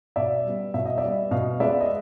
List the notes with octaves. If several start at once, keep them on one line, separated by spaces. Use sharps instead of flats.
B2 D5 E5
G3 B3
B2 E5
D#5
D5 E5
G3 B3
B2 D#5 F5
G#3 B3 D5 E5
D#5